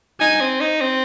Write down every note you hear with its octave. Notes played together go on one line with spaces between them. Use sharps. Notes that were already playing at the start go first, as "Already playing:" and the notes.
D#4 G#5
C4
D#4
C4